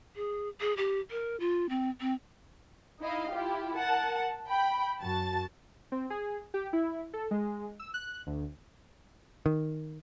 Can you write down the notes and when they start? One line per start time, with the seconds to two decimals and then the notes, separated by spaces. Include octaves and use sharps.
0.16 G#4
0.61 G#4
0.77 G4
1.11 A#4
1.40 F4
1.69 C4
2.01 C4
3.00 D#4 E4 D#5 F5
3.31 E4 F4 G4
3.75 A#4 F#5 A5
4.48 G5 B5
5.01 F#2 F#4 A5 A6
5.92 C4
6.10 G#4
6.54 G4
6.73 E4
7.13 A4
7.31 G#3
7.80 E6
7.94 F#6
8.27 D2
9.46 D#3